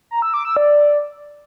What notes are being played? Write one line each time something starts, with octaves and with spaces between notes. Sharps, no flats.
A#5
E6
D6
E6
D5